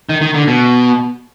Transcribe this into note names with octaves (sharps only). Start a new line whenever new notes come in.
D#3
D#3
D3
B2